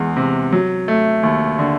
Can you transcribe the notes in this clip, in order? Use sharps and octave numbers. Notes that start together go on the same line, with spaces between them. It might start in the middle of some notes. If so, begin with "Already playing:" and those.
Already playing: E2 G#3
C3
F#3
A3
D#2
D3